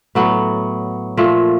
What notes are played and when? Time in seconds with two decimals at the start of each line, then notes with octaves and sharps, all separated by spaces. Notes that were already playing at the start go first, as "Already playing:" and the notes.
0.15 A2 F#3 B3
1.17 A#2 F3 A3